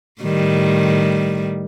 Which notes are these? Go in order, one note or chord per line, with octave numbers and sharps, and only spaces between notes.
A2 D#3 G3